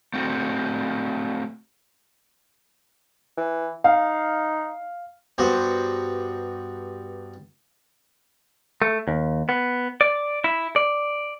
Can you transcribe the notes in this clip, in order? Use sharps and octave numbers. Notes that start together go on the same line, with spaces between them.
A3 C4 F#4 A4
E3
D#4 F5
G2 B3 F#4 C5
A3
D#2
B3
D5
E4
D5